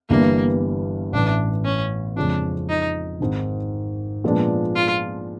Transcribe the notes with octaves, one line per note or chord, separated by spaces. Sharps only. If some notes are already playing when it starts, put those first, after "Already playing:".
G1 G2 E3 G3 A#3 B3
A1 A2 E3 D4
C#4
F2 C#3 F3 G#3 C#4 D4
D#4
G#1 G#2 D#3
A#2 F3 G#3 B3 D4
F4